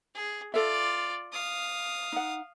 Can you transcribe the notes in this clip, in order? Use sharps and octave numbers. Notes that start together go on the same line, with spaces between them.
G#4
F4 A4 D5 E5
F5 D#6
D#4 F#5